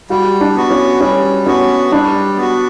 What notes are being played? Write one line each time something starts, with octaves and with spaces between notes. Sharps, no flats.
G3 F#4
D4
B3 F#4
C#4
G3 C#4
B3 C#4 F#4
G3 D4
B3 F#4